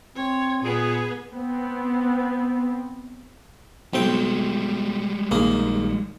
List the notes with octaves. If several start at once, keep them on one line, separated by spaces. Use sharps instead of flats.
C4 C#5
A#2 B3 G#4
B3 C4
B1 G3 G#3 C4 G5
A#1 D#3 A#3 G#4